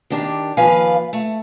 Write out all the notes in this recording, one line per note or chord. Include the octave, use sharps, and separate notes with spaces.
D#3 D4 G4
D#2 F3 B4 F5 G#5
A3